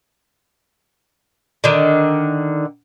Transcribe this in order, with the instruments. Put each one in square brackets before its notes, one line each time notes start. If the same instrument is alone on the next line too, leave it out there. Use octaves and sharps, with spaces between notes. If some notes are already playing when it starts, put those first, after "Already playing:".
[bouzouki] D3 D#3